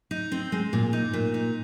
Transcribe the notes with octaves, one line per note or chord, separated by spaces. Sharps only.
D#4
C4
G#3
A#2
D#4
A#2
D#4